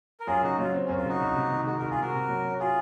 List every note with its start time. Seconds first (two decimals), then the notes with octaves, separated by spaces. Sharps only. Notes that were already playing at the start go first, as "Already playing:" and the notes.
0.20 A#4
0.27 F#2 F4 G#4
0.43 C#3 D#4 F#4
0.58 F#3 F4
0.74 C4
0.85 F#2 C#4
0.97 F4
1.05 C#3 D#4 F#4
1.21 C2
1.36 C3
1.52 D#3
1.66 G#3 D#4 F#4
1.78 C2 F#4 A#4
1.90 F4 G#4
1.98 C3 F#4 A#4
2.14 C3
2.28 F#3
2.45 C#4
2.59 F4 F#4 G#4